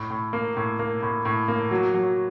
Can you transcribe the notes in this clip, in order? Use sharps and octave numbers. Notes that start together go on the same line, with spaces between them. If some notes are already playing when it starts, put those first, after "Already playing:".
Already playing: A2
A2
A#3
A2
A#3
A2
A2
A#3
F#3
F#3